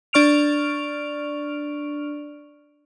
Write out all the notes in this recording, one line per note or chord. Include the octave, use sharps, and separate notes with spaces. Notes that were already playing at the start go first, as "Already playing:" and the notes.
D4 D5 C#6 F6 D7 F7